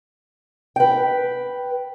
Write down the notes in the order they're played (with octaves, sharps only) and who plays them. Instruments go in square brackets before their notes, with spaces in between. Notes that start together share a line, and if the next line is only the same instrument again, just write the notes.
[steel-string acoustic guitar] B4 G5